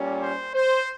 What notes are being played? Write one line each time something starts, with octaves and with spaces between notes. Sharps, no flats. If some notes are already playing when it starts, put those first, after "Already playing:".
Already playing: A#2 G3 C#4
C5
C5